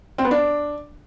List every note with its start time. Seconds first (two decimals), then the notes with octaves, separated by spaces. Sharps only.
0.18 C4
0.25 B3
0.31 D4